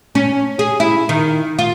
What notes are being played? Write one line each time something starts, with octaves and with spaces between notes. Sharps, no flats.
C#4
G#4
E4
D#3
F4